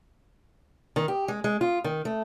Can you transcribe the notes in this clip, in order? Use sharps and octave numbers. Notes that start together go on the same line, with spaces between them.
D#3
G4
G#3
G#3
F4
D#3
A3